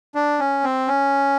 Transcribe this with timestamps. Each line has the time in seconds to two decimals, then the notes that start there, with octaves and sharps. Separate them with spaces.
0.15 D4
0.40 C#4
0.64 C4
0.88 C#4